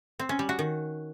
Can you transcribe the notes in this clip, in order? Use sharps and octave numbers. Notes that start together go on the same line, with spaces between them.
C4
C#4
G3
F#4
D#3